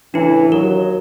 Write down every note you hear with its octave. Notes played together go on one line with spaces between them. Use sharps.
C#2 A2 E3 D4 E4
D#2 F#3 A#4